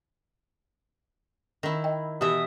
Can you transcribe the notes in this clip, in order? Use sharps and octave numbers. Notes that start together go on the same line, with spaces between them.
D#3 E4
D#5 G5
B2 E3 G4 E5 D#6